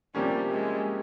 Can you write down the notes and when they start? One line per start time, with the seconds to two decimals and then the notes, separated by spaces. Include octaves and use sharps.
0.15 C3 F3 G3 A#3 C#4
0.52 G#3